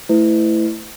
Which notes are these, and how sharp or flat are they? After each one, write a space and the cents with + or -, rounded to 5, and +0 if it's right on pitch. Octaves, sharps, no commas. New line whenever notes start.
A3 +0 E4 +0 B4 +40